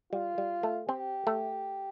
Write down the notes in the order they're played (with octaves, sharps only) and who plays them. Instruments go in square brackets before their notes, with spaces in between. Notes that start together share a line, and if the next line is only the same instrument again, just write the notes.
[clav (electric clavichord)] G3 [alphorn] F4
[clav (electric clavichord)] G3
A3
[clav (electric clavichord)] C4 [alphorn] G4
[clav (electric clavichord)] A3